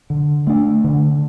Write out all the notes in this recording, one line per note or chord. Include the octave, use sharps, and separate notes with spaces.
D3
A3 D4
D3